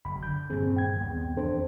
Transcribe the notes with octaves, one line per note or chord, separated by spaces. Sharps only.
F#1 B5
D3 G6
G2 A#2 D#3 C4 G#4
G5 G#6
D#2 B3 C4
E2 A#3 C4 D4 A4 C5